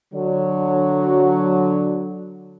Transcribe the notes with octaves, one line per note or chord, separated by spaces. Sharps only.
D3 F#3